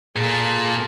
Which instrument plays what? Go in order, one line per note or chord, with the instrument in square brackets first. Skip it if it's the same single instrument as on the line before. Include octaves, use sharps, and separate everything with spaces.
[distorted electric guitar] A#2 [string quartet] G#4 A4 A5